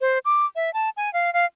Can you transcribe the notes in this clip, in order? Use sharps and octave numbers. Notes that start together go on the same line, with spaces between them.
C5
D6
E5
A5
G#5
F5
F5